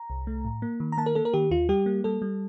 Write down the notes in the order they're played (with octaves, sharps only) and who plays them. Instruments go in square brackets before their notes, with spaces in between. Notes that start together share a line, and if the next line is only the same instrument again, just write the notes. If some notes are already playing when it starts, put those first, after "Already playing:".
Already playing: [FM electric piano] A#5
C2
A3
A2
A#3
D#3
A#5
A#3 A5
A#4
A#3 A4
A#4
D#3 G4
D#2 F4
G3 G4
A#3
G3 A4
G3